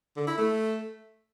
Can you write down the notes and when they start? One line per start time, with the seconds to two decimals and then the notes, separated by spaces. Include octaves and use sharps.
0.17 D3
0.27 E4
0.38 A3